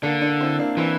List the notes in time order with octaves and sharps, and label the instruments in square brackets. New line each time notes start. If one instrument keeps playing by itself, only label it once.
[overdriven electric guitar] D3 [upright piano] A#3 D4
[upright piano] A#3 D4
C4 E4
A#3 D4
[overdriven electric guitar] E3 [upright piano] C4 E4